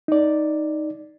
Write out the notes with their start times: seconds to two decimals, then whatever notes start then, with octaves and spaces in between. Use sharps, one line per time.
0.08 D#4 D5